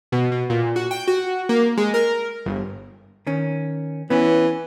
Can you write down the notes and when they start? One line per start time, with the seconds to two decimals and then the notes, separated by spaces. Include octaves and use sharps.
0.12 B2
0.32 B2
0.50 A#2
0.76 F#4
0.91 G5
1.08 F#4
1.49 A#3
1.77 G#3
1.94 A#4
2.46 G1
3.27 D#3 C#4
4.10 E3 B3 C#4